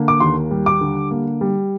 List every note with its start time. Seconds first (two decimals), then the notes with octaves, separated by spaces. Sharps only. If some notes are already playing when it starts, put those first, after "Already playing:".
Already playing: D3 A#3
0.08 D6
0.20 D#2 C6
0.51 G3
0.66 D6
0.81 D3
1.11 A#3
1.41 G3